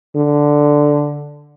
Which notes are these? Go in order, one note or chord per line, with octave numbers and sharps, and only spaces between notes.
D3